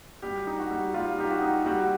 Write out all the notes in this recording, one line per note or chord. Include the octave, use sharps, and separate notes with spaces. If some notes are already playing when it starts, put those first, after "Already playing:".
G3 G4
D#4
F#4
G3
G3 F4
D#4 G4
F#4
D#4
G3 F#4